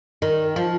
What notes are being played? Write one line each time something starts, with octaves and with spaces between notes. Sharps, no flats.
D#3
F3